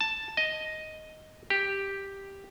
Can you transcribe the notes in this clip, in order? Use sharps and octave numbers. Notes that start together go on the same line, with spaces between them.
A5
D#5
G4